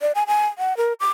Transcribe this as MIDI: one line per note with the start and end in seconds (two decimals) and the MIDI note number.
0.01 0.12 74
0.15 0.24 80
0.27 0.48 80
0.58 0.76 78
0.77 0.93 70
1.00 1.10 86